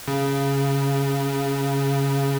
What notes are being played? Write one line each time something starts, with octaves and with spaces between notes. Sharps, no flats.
C#3